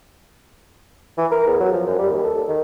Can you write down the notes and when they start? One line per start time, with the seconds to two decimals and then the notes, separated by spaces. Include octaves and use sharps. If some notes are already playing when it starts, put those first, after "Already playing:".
1.17 E3
1.31 A#4
1.47 E2
1.60 F#3
1.72 F3
1.87 F#2
1.98 G3
2.10 D#2
2.24 A4
2.48 D#3